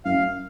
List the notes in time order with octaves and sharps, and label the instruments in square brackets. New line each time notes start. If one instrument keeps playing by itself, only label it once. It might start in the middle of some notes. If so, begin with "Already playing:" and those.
[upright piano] F#2 [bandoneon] F5